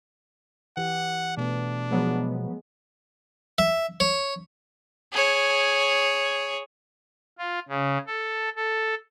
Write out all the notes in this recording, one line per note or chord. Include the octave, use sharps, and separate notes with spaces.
E3 G4 F#5
B2 A3 B3 D4
F3 F#3 G#3 B3
E5
C#5
G#4 C#5
F4
C#3
A4
A4